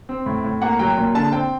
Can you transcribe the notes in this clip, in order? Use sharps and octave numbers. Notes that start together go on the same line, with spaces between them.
C4
A2
A2
A#3 F#5
F#3 G5
A#2
D3 A5
C4 G5